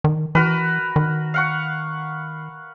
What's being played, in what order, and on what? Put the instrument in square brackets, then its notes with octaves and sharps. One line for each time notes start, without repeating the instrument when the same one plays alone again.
[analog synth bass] D#3
[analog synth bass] E3 [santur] F#4 A#4 B4
[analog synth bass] D#3
[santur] F5 F#5 C#6